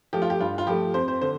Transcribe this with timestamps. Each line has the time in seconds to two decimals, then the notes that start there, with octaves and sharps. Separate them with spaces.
0.13 F3 A3 G4
0.22 F4
0.30 G4
0.40 G2 F4
0.58 F4
0.67 F3 A3 G4
0.94 F2 C5
1.08 C5
1.22 D3 C5